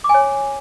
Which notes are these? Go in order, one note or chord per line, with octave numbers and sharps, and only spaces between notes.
D6
G#5
C#5